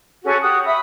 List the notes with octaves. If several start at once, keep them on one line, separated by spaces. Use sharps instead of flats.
C#4 F#4 G#4 A4
F#4 G4 D#6
E5 B5 D#6 E6